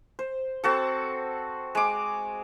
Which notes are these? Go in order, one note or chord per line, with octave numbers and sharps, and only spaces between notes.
C5
C4 F#4 A4
G#3 D6